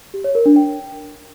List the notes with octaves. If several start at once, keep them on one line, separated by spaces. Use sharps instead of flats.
G4
C#5
A#4
D4
G5